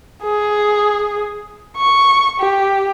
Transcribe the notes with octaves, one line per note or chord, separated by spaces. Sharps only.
G#4
C#6
G4